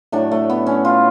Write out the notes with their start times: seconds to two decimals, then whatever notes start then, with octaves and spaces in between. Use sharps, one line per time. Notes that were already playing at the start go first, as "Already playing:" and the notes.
0.12 A2 F#3 A3 D4
0.31 A3
0.50 B3
0.66 C#4
0.85 F4